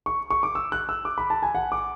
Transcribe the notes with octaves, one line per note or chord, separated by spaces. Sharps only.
C#6
C#6
D6
E6
F#6
E6
D6
B5
A5
G#5
F#5
D6